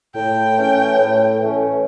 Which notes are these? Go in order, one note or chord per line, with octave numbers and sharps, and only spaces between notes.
A2 G5
E3 A3 C#4
A2
E3 A3 C#4